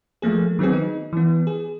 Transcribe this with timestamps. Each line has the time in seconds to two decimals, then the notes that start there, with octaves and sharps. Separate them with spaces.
0.22 F3 A3 A#3 G#4
0.59 D#3 F#3 B3 C4 G#4
0.73 D#4
1.13 E3 B3
1.47 G#4